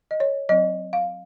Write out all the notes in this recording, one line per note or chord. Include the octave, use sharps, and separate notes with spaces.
D#5
C#5
F#3 C4 D#5
F5